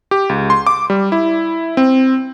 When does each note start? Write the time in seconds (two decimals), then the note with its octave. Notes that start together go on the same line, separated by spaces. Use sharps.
0.11 G4
0.29 C#2
0.50 C6
0.67 D6
0.90 G3
1.12 E4
1.77 C4